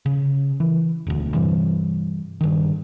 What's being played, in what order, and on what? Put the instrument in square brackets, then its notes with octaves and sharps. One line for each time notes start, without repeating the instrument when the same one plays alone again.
[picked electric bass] C#3
E3
E1 D2
G2 C3 E3 G3
G2 D#3